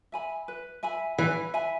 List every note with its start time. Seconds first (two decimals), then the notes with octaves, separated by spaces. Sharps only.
0.12 E5 G#5 B5
0.48 B4
0.83 E5 G#5 B5
1.18 E3 B4
1.54 E5 G#5 B5